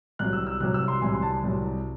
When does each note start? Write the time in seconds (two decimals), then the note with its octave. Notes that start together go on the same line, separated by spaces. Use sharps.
0.19 C2 C3 F#3 F#6
0.33 E6
0.47 E6
0.60 C2 C3 F#3 F#6
0.74 E6
0.88 C6
1.02 C2 C3 F#3 G#5
1.14 C6
1.22 A5
1.43 C2 C3 F#3